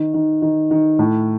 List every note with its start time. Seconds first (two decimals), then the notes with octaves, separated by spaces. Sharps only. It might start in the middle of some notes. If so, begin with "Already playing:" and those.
Already playing: D#3
0.14 D#3
0.42 D#3
0.71 D#3
0.99 A2